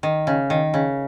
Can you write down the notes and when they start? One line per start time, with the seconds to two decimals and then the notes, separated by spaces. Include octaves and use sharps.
0.03 D#3
0.27 C#3
0.50 D#3
0.74 C#3